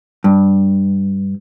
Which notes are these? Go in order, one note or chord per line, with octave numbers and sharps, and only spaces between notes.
G2